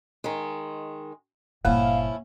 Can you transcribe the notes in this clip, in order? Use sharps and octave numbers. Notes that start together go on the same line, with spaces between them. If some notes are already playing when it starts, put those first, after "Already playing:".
D#3 G#3
G1 A#2 F3 A#3 C#4 E4 F5